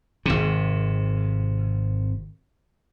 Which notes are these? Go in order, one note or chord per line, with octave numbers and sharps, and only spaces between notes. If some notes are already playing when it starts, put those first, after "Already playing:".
G#1 C3